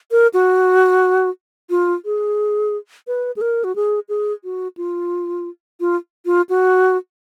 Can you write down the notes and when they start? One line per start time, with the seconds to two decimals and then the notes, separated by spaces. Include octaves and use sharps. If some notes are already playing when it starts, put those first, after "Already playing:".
0.11 A#4
0.34 F#4
1.70 F4
2.05 G#4
3.07 B4
3.36 G#4
3.41 A#4
3.64 F#4
3.76 G#4
4.09 G#4
4.44 F#4
4.77 F4
5.80 F4
6.26 F4
6.49 F#4